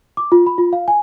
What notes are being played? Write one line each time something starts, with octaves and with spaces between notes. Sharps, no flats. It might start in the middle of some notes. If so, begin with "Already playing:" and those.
D6
F4
B5
F4
F5
G#5